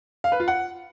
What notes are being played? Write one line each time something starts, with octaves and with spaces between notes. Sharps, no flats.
F5
B4
F4
F#5